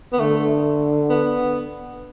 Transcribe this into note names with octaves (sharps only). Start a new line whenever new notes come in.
B3
D3 A3
B3